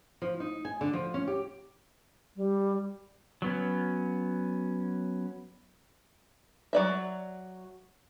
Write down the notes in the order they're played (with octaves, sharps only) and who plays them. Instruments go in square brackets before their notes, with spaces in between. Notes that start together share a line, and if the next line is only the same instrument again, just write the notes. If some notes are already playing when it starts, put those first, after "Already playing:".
[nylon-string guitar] F3
D#4
G#5
D3
F3
C#4
G4
[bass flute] G3
[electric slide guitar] F#3 B3 C#4
[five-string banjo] F#3 D5 E5